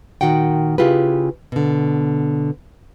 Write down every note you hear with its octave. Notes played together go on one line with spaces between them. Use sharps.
A#2 D#3 F#4 F#5 G5
C#3 E4 F4 G4 G#4 B4
B2 D3